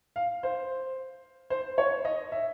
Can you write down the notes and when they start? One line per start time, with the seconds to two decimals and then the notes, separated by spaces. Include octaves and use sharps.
0.16 F5
0.43 C5
1.50 C5
1.78 C#5
2.05 D#5
2.32 E5